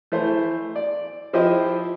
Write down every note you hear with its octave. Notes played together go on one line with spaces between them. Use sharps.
E3 A3 C5
D5
F3 E4 G4 C5 D#5